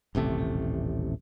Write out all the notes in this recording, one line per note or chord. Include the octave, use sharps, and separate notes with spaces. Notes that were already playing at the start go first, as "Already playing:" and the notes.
D#1 A1 C3 A3